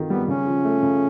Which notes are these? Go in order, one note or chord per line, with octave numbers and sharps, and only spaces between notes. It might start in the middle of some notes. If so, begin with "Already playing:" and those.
Already playing: D#3 C4 F4
G3 B3
C#3 C#4
F3
A3
C#3